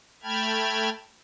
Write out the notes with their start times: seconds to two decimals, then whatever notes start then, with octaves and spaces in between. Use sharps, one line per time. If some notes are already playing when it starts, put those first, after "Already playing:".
0.23 A3 G5 A5 B5 F6 G#6